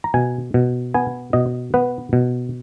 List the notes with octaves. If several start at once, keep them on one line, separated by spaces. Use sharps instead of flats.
A#5
B2 G#5
B2
B3 G#5
B2 D#5
B3 B4
B2